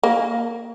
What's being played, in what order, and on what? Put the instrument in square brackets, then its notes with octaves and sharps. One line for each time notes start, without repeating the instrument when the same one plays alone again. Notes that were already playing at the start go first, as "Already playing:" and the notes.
[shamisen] A#3